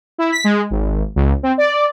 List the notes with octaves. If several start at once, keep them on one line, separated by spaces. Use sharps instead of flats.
E4
B6
G#3
G#1
C#2
C4
D5